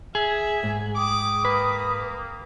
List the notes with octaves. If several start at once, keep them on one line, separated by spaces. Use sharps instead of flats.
G#4 E5
G#2
G5 D6 D#6
A#3 B4